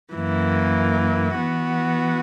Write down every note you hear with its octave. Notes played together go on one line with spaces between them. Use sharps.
F#2 E3 A#3
E3 B3 F#4